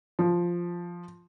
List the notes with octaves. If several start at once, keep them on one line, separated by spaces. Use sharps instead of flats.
F3